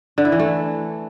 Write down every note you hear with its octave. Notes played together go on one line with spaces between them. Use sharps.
D3
E4
E3
A3